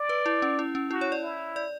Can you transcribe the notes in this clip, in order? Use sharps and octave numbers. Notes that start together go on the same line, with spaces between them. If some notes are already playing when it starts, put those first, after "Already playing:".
Already playing: D5
B4
E4
C#4
E4
C#4
E4 F#4
C#5
D5
E4
D5